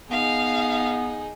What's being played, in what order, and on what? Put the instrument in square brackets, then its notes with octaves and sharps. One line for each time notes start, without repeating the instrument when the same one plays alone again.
[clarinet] B3 [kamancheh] D#4 G#4 [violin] F5